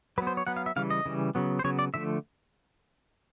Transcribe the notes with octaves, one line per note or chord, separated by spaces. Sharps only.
F#3 B3 B4 C5
C#5
F#3 B3 F#5
F5
E5
C#3 E3 G3 F5
D#5
C#3 E3 G3
C#3 F#3 B3
C5
C#3 F#3 B3 C#5
D5
D3 F3 A3 E5